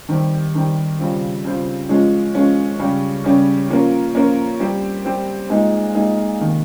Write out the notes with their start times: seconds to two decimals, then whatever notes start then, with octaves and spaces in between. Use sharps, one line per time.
0.09 D#3 G3 C4 G4
0.55 D#3 G3 C4 G4
0.99 C#3 G3 C4 F4
1.44 C#3 G3 C4 F4
1.89 F3 G#3 C#4 F4
2.34 F3 G#3 C#4 F4
2.79 C#3 G3 C#4 G4
3.24 C#3 G3 C#4 G4
3.69 F3 A#3 C#4 F4 A#4
4.15 F3 A#3 C#4 F4 A#4
4.60 G3 C4 G4 C5
5.05 G3 C4 G4 C5
5.50 A#2 G#3 D#4 G#4
5.95 A#2 G#3 D#4 G#4
6.40 C3 D#3 A#3